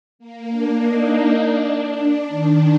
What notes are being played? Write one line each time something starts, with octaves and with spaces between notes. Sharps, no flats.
A#3
D4
D#4
D4
D#3